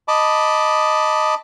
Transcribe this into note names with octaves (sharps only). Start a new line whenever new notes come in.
D#5 A5 B5 D6